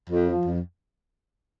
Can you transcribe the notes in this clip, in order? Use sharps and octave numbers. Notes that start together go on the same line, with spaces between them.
F2
F3
F2